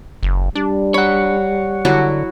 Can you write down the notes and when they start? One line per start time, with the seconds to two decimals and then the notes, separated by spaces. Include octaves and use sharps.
0.23 F#1
0.55 G3 D4
0.94 C#5 F#5 B5
1.85 D3 F#3 E4 F#4